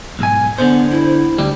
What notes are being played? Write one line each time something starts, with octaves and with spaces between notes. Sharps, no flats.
B1 G#2 G#5
D3 B3 C5
E4
D2 G3